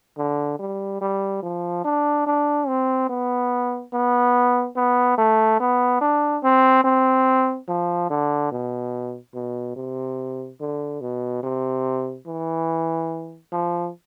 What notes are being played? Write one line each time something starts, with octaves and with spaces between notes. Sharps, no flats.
D3
G3
G3
F3
D4
D4
C4
B3
B3
B3
A3
B3
D4
C4
C4
F3
D3
B2
B2
C3
D3
B2
C3
E3
F3